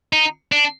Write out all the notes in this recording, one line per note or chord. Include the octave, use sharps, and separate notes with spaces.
D#4
D4